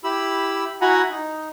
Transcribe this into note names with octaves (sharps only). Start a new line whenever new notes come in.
E4 G4 B5 E6
E4 F#4 F#5 G#5 A#5 B5
D#4